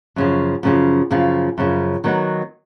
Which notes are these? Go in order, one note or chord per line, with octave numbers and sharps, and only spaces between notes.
F#2 C#3 F3
F#2 C#3 F3
F#2 C#3 F3
F#2 C#3 F3
D#3 F#3 B3 D#4 F#4